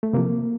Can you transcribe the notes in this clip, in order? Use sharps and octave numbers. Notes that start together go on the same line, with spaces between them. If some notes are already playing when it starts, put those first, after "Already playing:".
A3
C3 F3 A#3